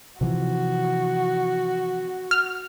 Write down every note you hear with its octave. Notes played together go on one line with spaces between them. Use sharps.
C3 E3 F3 F#4
F6